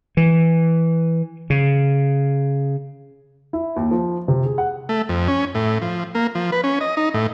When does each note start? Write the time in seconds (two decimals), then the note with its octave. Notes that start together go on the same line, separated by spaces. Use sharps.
0.17 E3
1.50 C#3
3.53 E4
3.76 D#2
3.91 F3
4.28 C3
4.46 G#4
4.58 F#5
4.89 A3
5.09 F2
5.28 C#4
5.55 A2
5.82 F3
6.15 A#3
6.35 F3
6.52 B4
6.64 C#4
6.81 D#5
6.97 D#4
7.14 A2